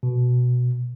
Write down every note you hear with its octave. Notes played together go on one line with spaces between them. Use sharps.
B2